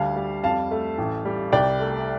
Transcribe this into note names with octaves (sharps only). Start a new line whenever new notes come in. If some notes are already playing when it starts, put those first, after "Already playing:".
Already playing: D2 G3 F5 A5
G3
F2 F5 A5
A3
A1
G3
C2 D5 G5
A3